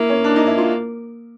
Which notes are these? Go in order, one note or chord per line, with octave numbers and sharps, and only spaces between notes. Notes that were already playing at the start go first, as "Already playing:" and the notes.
Already playing: A#3 E4
C#4
D4
D#4
E4
F4